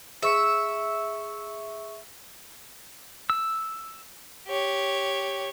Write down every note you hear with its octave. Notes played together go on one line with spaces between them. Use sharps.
G#4 E5 C#6 C#7
E6
G4 C#5